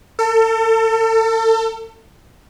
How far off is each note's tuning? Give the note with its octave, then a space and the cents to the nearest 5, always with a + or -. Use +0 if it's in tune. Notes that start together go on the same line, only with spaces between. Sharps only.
A4 +35